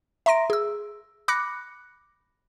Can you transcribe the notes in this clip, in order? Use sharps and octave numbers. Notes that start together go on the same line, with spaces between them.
E5 A#5 C6 A#6 D7
G#4 E6
B5 D6 F#6 A#6 C#7